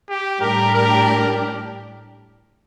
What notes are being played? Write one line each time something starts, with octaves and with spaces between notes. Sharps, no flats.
G4
A2 G3 D4 G4 A#4
A#4